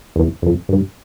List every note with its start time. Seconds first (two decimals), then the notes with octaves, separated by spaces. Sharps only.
0.16 E2
0.42 F2
0.69 G2